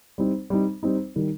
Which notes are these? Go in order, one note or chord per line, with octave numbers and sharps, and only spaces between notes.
G3 C4 D#4
G3 C4 D#4
G3 C4 D#4
D#3 G3